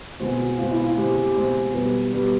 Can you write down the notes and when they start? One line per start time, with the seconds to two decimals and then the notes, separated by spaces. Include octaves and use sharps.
0.20 B2 G#3 C4 F#4
0.39 F#4
0.58 B2 G#3 C4 F4
0.71 E4
0.84 F4
0.97 B2 G#3 C4 G4
1.10 G4
1.23 G4
1.35 B2 G#3 C4
1.74 B2 G3 B3
2.12 B2 G3 B3